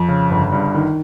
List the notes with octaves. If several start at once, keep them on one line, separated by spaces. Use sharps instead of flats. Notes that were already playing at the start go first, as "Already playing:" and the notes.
Already playing: F2
C#3
G1
G2
D#3